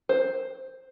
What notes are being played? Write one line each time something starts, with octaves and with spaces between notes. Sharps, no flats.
C5